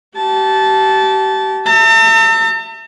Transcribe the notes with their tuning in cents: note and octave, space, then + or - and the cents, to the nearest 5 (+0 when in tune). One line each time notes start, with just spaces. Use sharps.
G4 -35 A5 -15
E5 +0 A5 +45